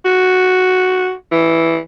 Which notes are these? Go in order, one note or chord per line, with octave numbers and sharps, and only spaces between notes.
F#4
E3